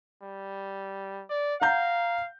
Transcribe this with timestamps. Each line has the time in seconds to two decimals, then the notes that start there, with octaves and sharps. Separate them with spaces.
0.22 G3
1.30 D5
1.61 F5 F#5 A#5 G6